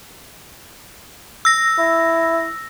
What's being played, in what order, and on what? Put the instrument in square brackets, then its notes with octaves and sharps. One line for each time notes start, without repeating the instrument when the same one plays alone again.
[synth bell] E6 A#6
[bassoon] E4